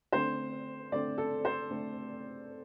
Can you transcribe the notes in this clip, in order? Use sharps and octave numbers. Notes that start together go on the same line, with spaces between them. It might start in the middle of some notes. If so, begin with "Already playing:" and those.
D3 A3 C4 C5
D3 A3 C4 D5
A4
C5
D3 A3 C4